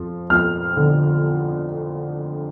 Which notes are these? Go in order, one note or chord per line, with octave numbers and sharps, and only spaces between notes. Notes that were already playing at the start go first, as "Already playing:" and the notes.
Already playing: F2 F3
F2 F6
D3